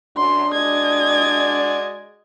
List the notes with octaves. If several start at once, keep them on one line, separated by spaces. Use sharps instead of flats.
F#2 D4 C6
G#3 F#4 D5 D#5 G#6